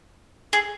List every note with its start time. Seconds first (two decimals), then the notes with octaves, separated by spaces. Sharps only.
0.53 G#4